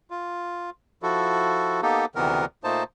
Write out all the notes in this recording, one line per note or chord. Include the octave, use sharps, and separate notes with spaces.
F4
F3 E4 F#4 A4
A#3 B3 D#4 G4 A4
D2 C3 D#3 E3 B3 A#4
A#2 A3 A#3 D#4 C5 A5